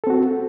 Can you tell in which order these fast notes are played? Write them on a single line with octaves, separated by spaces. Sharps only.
A4 C4 F#4